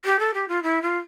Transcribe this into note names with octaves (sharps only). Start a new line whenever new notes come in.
G4
A4
G4
F4
E4
F4